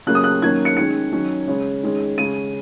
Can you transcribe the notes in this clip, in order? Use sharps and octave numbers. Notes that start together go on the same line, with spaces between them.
C#3 F#3 A#3 C#4 F#6
D#6
F#6
D#3 F#3 A#3 C#4 G#6
C#7
D#3 G#3 C#4 C#7
D#3 F#3 C#4
C#3 G#3 C#4
D#3 G#3 C#4
C#3 G#3 C#4 D#7